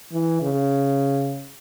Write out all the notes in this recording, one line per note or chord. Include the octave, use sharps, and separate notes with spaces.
E3
C#3